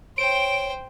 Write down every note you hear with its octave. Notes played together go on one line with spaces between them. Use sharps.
C5 C#5 G5 D7